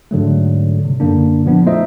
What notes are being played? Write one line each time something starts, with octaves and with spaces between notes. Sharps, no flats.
G#2 D3 F#3 A3
C3
F#2 D3 A#3 D4
A#2 F3 B3 D4
A3 D#4 F4 C5 D#5 E5